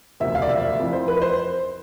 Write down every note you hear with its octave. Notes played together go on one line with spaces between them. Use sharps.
E1 D2 C3 F3 E5
F5
D5
E5
F1 F2 E3
C5
B4
C5